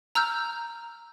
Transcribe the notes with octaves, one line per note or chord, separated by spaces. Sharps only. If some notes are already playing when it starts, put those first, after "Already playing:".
A#5 E6 F6 G6